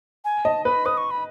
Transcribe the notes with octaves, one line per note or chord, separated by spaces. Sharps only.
G#5
D#5 A5
B4 B5
B4 D#6
C#6
B5